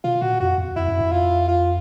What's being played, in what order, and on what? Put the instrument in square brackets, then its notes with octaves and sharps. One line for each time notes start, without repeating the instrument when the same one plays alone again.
[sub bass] B2 [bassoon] F4
[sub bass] A#2 [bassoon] F#4
[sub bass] F2 [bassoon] F#4
[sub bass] E2
[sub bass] F2 [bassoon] E4
[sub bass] F#2
F2
[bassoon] F4
F4